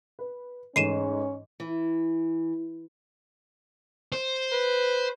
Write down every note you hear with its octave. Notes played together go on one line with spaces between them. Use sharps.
B4
G#2 E3 A3 C#4 C7 D#7 E7
E3
C5
B4